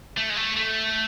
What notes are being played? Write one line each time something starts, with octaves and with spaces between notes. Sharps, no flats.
A3
G#3
A3
A3